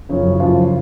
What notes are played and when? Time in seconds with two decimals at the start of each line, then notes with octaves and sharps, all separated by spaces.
0.09 F#1 F#2 C#3 F3 C#4
0.40 F3 F4